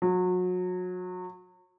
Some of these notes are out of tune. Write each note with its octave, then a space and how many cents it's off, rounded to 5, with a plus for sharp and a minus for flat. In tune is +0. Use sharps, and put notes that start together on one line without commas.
F#3 -30